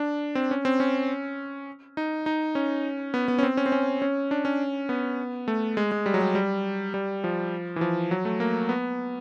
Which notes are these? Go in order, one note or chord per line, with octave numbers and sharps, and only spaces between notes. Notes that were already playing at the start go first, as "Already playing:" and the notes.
Already playing: D4
C4
C#4
C4
C#4
D#4
D#4
C#4
B3
B3
C#4
C4
C#4
C4
C#4
C#4
D4
C#4
B3
A3
G#3
G#3
G3
F#3
G3
G3
G3
F3
E3
F3
F#3
A3
A#3
B3